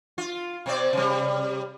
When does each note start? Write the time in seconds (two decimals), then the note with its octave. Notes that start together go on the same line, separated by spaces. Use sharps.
0.18 F4
0.66 B2 C4 D5
0.93 C3 G3